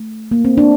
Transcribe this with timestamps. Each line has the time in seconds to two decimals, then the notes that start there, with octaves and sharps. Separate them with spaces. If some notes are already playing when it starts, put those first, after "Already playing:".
Already playing: A3
0.31 A#3
0.45 C4
0.58 D4